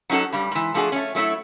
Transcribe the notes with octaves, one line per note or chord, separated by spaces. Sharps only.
F#3 C#4 D#4 F#4 A4
G2 G3
G#2 E3
F3 A3 D4 F#4 G#4
A3 C#4
F#3 A3 D#4 E4